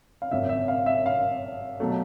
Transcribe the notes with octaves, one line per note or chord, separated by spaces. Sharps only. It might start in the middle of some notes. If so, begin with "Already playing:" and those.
F5
G#1 F#2 C#3 E5
E5
F5
E5
F5
B2 F#3 A3